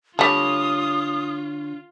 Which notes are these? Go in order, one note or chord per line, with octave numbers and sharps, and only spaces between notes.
D3 G3 A3 F4 C#5 D#6